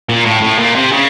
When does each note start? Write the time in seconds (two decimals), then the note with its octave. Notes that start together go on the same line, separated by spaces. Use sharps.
0.09 A#2
0.26 A2
0.42 A2
0.59 A#2
0.76 C3
0.92 C#3